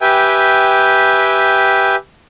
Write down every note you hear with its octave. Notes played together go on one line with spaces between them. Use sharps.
G4 B4 E5 G5 G#5